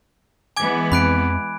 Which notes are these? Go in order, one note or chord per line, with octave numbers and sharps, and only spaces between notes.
E3 G#3 B3 G#5 D6 G#6
F2 C4 B5 F#6 D7